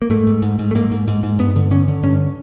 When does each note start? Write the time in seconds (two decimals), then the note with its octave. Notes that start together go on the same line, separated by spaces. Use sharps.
0.02 A#3
0.10 G#2 A3
0.27 G#2
0.42 G#2
0.59 G#2
0.71 A3
0.75 G#2 A#3
0.91 G#2
1.08 G#2
1.23 G#2
1.39 G2 B3
1.56 D3
1.71 D3 C#4
1.88 D3
2.03 G2 C#4